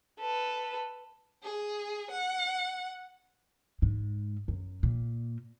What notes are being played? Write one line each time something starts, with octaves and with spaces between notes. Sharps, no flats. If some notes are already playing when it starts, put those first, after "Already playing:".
A4 B4
G#4
F#5
G#2
F#2
A#2